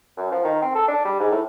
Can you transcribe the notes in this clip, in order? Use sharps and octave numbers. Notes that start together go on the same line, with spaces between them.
F#2
F3
D#3
C4
A4
D4
G3
G#2
A2